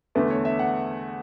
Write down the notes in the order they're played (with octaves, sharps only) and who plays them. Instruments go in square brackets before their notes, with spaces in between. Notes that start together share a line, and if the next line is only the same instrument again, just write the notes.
[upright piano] E2 D3 A3 [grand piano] B4
[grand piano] C#5
E5
F#5